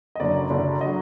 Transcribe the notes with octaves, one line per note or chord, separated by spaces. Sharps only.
D#5
F#1 F#2 D3 F#3 D5
F#1 F#2 D3 F#3
D3 F#3 D#5